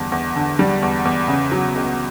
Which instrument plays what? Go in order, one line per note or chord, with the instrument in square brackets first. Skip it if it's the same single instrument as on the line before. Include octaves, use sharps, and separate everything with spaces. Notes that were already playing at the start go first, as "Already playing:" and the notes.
Already playing: [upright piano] E2 D3 G3
E2
D3
G3
E2
E2
C#3
F#3
C#2